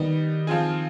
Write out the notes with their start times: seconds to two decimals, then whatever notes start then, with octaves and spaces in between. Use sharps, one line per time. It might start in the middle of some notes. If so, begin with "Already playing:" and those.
Already playing: D#3 G3 B3 D#4
0.47 F3 C4 F4 G#4